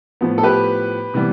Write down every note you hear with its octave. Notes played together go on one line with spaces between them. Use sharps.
A2 F3 B3
A4
G4 B4
C3 E3 G3 B3